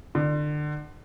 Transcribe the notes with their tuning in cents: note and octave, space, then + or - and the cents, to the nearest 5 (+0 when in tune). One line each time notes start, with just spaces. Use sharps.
D3 +30